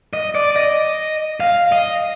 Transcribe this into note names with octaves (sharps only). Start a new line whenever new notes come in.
D#5
D5
D#5
F5
D#5